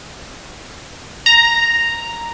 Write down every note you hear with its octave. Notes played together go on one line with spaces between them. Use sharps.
A#5